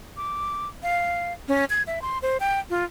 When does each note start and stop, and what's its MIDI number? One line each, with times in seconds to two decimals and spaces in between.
0.17 0.69 86
0.83 1.33 77
1.48 1.65 61
1.70 1.82 92
1.87 2.02 76
2.02 2.18 84
2.22 2.37 72
2.40 2.60 79
2.70 2.84 65